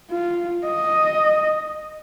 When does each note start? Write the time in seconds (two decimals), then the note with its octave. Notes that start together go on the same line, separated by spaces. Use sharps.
0.11 F4
0.65 D#5